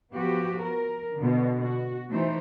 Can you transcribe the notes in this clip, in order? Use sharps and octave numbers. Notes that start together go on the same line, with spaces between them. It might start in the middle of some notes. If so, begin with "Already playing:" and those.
F3 B3 F#4 G4
A#4
B2 D3
F#4
E3 A3 D#4 C5